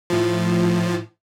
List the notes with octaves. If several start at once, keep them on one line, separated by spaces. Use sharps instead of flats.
A2 F3